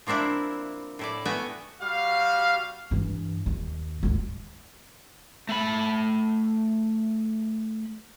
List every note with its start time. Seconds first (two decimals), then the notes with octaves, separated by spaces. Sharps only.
0.07 F3 A#3 C4 D4 E4
0.99 A2 E4 D5
1.25 A3 B3 F#4 G5 G#5
1.81 G3 F#4 F5
2.91 G2 E3
3.46 D#2
4.03 D2 G#2
5.49 A3 B5